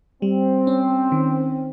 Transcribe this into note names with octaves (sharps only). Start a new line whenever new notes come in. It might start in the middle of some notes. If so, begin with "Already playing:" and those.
G3 C4
C#4
D#3